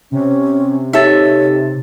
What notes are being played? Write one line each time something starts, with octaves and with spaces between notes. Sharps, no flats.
C3 C#4
D#4 G4 A4 C#5 E5 A6